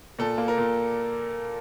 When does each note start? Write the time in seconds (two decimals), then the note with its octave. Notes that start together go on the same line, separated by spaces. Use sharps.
0.19 A#2 A4
0.38 A#3
0.48 A#4
0.58 A#2